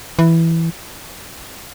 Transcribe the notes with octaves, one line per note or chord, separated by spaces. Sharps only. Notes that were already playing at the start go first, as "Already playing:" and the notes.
E3